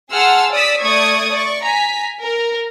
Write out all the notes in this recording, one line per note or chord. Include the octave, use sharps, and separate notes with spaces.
G#4 F#5 A5 C6 E6 F6
D5 D#6 E6 B6
A3 D5 C#6 D#6 G#6
D5 C#6
G#5 A#5 B6
A#4